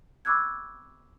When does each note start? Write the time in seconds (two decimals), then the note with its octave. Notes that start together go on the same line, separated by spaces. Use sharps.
0.25 B5 C#6 D6 E6 F#6 G#6